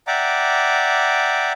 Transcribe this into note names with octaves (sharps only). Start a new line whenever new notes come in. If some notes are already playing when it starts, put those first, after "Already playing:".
D5 E5 F#5 G5 A#5 D6